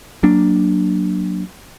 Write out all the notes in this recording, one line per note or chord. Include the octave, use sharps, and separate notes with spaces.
F#3 A#3 D4